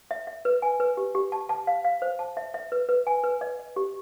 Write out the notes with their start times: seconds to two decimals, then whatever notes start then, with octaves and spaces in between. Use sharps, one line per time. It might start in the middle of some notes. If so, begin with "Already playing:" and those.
0.11 E5
0.27 E5
0.45 B4
0.62 G#5
0.80 B4
0.97 G4
1.15 G4
1.32 A5
1.49 A5
1.67 F5
1.85 F5
2.02 C5
2.19 A5
2.37 E5
2.54 E5
2.72 B4
2.89 B4
3.07 G#5
3.24 B4
3.41 D#5
3.59 D#5
3.76 G4